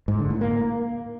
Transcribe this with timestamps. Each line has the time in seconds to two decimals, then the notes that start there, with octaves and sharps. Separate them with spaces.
0.08 G#2
0.19 D3
0.30 A2
0.41 A#3